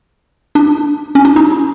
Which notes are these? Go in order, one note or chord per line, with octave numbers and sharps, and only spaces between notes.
D4
C#4
D4
D#4